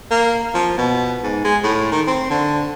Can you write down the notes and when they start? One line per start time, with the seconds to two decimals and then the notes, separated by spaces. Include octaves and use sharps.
0.11 A#3
0.54 F3
0.78 B2
1.23 G#2
1.45 G#3
1.63 A2
1.91 D#3
2.07 C4
2.30 D3